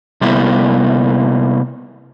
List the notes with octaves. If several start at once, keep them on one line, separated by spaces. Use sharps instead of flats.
C3 G3 A#3 B3 E4